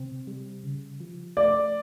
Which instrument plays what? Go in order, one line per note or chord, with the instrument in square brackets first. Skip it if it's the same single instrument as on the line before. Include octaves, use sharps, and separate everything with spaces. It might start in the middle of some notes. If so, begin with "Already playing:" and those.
Already playing: [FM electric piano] C3 C4
G3
C#3
F3
[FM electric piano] A3 [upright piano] D5